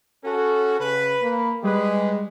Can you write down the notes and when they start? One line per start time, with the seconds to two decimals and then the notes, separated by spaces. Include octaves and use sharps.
0.25 C#4 F#4 A4
0.80 C#3 B4
1.22 A#3 B5
1.64 G3 G#3 G4 G#4 B4